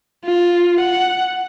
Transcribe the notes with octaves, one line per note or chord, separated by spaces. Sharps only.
F4
F#5